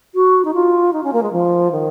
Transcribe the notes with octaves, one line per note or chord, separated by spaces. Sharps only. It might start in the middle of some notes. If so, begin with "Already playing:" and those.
F#4
D#4
F4
D#4
C#4
A#3
G#3
F3
D#3